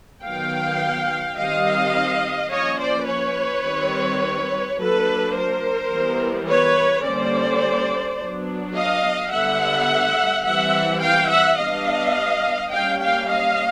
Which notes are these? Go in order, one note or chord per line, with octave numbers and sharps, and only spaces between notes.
D#3 F#3 B3 F5 G5
D#3 G3 C4 D#5 F5
F3 A#3 C#4 C#5 D#5
C5 D5
B4 C#5
D#3 G3 C4
F#3 A#3 D4 A4 B4
A#4 C5
E3 G3 B3
B4 C#5
D3 G3 A#3 C#4 C5 D5
F#3 B3 D4
D#5 F5
D3 G3 B3 E5 F#5
E3 G3 C4 E5 F#5
F5 G5
E5 F#5
G3 B3 D4 D#5 F5
G3 A#3 C#4 F5 G5
F5 G5
D#5 F5